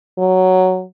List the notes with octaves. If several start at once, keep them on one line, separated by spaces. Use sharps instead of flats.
F#3